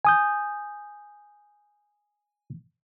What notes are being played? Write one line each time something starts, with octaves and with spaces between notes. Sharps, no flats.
G#5 D#6 G6